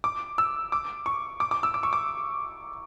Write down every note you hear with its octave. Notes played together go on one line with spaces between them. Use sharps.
D6
E6
D6
C#6
D6
D6
E6
D6
C#6
D6